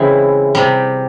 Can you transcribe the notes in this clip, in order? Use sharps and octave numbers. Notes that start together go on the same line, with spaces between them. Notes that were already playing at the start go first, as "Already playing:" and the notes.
Already playing: C#3 E3 G#3 C4 E4
C3 G3